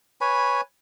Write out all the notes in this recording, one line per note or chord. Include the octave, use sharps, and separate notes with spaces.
B4 C#5 G#5 B5